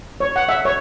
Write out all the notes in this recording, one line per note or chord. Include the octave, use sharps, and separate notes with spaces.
C#5
F#5
E5
C#5